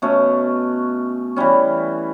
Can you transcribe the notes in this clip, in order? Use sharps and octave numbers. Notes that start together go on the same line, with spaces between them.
B2 A3 C#4
E3 G3 C#4